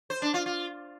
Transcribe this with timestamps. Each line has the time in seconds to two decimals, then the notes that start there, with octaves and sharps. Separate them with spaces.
0.10 C5
0.22 D4
0.34 F4
0.46 F4